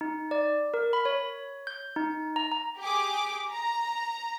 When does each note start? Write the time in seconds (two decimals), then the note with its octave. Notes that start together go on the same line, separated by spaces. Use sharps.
0.01 D#4
0.31 D5
0.74 A#4
0.93 B5
1.05 C#5
1.67 G6
1.96 D#4
2.36 A#5
2.52 A#5
2.79 G4 G#4 D6
3.49 A#5